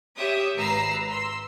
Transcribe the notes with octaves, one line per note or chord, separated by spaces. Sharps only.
G4 C#5 E5 D#6
G#1 B4 A#5 E6 C7
C6 E6